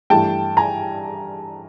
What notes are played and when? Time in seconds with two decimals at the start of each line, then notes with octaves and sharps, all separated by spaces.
0.10 G2 E3 A3 G5 A5
0.57 G#5 A#5